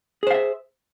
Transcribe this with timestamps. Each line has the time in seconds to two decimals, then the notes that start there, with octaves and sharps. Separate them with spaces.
0.23 G#4
0.27 C5
0.31 F5
0.34 E5